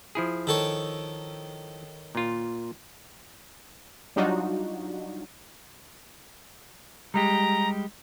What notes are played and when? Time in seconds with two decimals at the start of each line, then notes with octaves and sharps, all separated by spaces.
0.15 F3 E4 G#4
0.47 D#3 A4 C#5
2.15 A#2 F4
4.16 F#3 G3 D4 D#4 F4 F#4
7.14 G3 G#3 G4 A#5